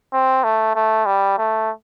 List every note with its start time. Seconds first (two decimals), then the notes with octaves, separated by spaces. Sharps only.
0.13 C4
0.44 A3
0.76 A3
1.06 G3
1.38 A3